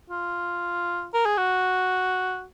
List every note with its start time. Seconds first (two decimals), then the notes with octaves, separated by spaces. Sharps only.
0.10 F4
1.14 A#4
1.25 G#4
1.38 F#4